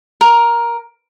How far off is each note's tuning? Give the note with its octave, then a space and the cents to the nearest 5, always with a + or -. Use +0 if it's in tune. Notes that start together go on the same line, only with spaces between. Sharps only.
A#4 +10